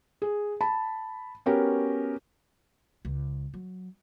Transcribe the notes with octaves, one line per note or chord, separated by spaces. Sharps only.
G#4
A5 B5
B3 C#4 F#4 G4 A#4
C#2
F#3